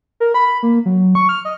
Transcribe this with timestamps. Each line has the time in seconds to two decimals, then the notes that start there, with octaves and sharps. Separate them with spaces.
0.20 A#4
0.34 B5
0.63 A#3
0.86 F#3
1.15 C#6
1.29 F6
1.45 D#5